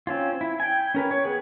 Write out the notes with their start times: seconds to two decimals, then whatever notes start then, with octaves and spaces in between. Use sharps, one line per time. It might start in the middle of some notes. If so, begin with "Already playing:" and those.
0.07 C4 C#4 F4
0.41 E4
0.60 G5 G#5
0.94 C#4 A#4 B4
1.11 C#5
1.24 B3 G#4 B4